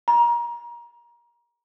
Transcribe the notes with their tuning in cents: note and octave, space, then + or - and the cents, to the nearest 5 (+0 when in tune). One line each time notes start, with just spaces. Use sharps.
A#5 +30